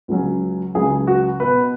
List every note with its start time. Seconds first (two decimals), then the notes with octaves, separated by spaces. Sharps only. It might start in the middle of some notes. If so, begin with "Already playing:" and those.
0.08 C#2 C#3 F#3 C#4
0.75 C#2 C#3 F#3 C#4 G#4
1.07 F#4
1.40 B2 B3 B4